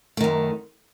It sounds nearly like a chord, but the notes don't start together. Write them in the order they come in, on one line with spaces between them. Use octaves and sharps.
A3 D#3 F#2